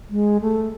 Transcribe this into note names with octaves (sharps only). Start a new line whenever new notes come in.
G#3
A3